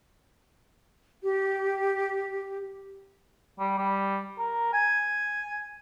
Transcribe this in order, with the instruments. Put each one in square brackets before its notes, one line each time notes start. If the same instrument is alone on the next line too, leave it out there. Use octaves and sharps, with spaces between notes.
[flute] G4
[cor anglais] G3
G3
A#4
G#5